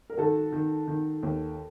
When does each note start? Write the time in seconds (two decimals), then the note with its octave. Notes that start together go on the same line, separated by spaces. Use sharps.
0.10 A#4
0.17 D#3 F#4 A4
0.52 D#3
0.88 D#3
1.23 D#2